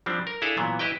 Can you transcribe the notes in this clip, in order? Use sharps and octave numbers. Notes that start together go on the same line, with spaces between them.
F3 G3 C4 D4
A#4
D4 E4 G#4 A4 F5
A#2 E3 F#3 B3
E4 G4 B4 D#5 G5